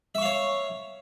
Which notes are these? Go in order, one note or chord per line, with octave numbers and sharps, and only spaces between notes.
C#5 E5 F5 C#6